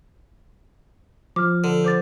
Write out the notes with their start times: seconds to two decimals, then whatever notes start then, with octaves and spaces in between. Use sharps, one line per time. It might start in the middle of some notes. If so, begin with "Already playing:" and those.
1.36 F3 D6 F6
1.64 D3
1.84 C5 D6 A6